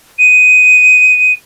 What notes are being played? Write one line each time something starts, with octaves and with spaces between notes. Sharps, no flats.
D#7